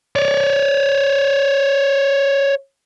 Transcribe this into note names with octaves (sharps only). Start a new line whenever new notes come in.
C#5 D5